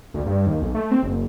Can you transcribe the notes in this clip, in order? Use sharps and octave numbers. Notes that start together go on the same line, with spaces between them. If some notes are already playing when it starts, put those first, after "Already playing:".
D2
G2
D#2
B1
A3
C4
F#1